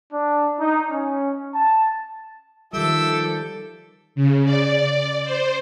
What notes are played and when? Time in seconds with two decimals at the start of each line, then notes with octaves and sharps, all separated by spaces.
0.12 D4
0.58 D#4
0.91 C#4
1.55 A5
2.73 D#3 F3 G3 A4 E5 D6 E6 G6
4.15 C#3
4.45 D5
5.24 C5